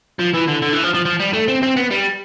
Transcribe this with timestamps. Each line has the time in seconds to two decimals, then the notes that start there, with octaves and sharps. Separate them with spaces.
0.20 F3
0.34 E3
0.48 D3
0.62 D3
0.73 E3
0.83 F3
0.94 F3
1.05 F3
1.20 G3
1.33 A3
1.48 C4
1.63 C4
1.77 B3
1.91 G3